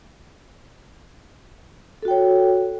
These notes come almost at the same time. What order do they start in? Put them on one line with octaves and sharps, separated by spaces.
A4 F#4 G5 C#5